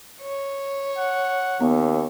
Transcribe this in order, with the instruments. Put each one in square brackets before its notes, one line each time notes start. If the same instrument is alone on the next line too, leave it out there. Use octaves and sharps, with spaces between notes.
[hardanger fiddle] C#5
[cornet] F#5
[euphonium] D#2 [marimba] B3